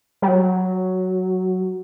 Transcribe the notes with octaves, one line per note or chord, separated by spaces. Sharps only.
G3
F#3